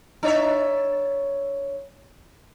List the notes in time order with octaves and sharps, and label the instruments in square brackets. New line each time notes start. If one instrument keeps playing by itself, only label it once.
[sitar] D4 C#5 E5